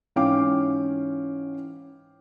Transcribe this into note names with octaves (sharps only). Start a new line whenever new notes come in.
G#2 E3 C#4 F5 G5 D6